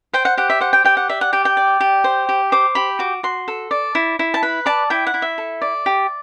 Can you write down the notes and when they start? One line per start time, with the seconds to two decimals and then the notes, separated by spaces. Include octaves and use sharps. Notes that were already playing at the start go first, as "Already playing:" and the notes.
0.13 C5 G5
0.25 F#5
0.37 G4 F#5
0.50 E5
0.61 C5 F#5
0.73 G5
0.84 G4 G5
0.97 F#5
1.09 D5 E5
1.21 F#5
1.33 G4 G5
1.45 G5
1.57 D5
1.80 G4
2.04 C5
2.29 G4
2.52 C5 D6
2.75 G4 B5
2.99 F#4 D6
3.23 F#4 C6
3.48 A4
3.71 D5
3.95 E4
4.19 E4
4.34 A5
4.43 B4 B5
4.66 D5 A5
4.90 E4 G5
5.07 F#5
5.14 E4
5.22 E5
5.38 A4
5.62 D5
5.86 G4